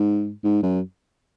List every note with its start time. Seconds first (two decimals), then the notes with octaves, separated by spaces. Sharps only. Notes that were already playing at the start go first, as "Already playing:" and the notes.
Already playing: G#2
0.44 G#2
0.63 F#2